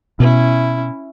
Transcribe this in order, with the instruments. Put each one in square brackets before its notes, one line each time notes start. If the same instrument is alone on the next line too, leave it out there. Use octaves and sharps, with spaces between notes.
[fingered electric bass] B2 [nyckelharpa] C#4 E4